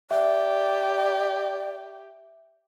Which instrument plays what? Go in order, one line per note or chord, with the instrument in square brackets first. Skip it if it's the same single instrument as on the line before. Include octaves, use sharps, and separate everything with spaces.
[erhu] G4 [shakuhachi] D5 [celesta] E5